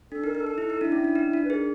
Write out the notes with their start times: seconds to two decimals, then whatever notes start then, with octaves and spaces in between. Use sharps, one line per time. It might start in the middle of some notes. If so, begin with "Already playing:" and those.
0.12 D4 A4
0.24 D#4 A#4
0.35 D#4
0.40 A4
0.47 D#4
0.58 E4
0.70 D#4
0.81 D4 E4
0.92 C#4
1.04 D4
1.15 D#4
1.33 D4
1.44 B4
1.50 G#4 A#4